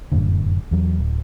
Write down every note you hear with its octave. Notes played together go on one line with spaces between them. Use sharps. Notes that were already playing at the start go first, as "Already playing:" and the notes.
F1 F#2 A2 D3
E2 F#3
D1